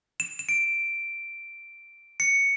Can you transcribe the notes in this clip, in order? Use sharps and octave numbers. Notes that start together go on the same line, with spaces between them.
E7
E7
D7
C#7